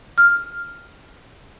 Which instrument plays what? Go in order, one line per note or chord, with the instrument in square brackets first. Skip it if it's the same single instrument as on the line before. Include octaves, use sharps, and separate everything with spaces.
[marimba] F6